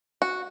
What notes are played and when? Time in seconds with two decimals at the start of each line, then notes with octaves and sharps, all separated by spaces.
0.22 F#4